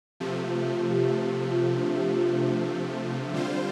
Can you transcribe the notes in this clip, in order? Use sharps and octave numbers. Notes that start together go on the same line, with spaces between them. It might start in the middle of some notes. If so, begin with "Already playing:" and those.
C3 F3 A3 G4
F4
F4
G4
F4
G4
F4
D4
G4
F4
D4
D4
D3 G3 C4 F4 C5